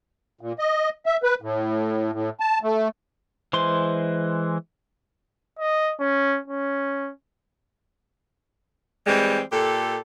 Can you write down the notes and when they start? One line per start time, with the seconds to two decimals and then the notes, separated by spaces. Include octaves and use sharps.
0.41 A#2
0.59 D#5
1.06 E5
1.23 B4
1.42 A2
2.13 A2
2.40 A5
2.63 A3
3.53 E3 G#3 C5 C6
5.59 D#5
6.00 C#4
6.48 C#4
9.07 E3 G3 G#3 C4
9.52 A#2 G4 A4